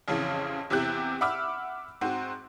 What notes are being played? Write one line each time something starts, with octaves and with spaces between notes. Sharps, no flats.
A1 F2 C#3 E3
E2 C3 E4 G4 F#6
E5 F#5 B5 D6 E6 F6
G#2 C4 F#4